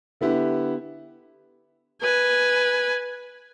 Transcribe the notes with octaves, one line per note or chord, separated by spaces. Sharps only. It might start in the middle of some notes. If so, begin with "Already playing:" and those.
D3 B3 E4 G4
B4 G#5